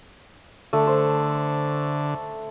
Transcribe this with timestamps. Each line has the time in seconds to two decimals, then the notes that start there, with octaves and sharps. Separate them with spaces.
0.73 D3 A3
0.87 C5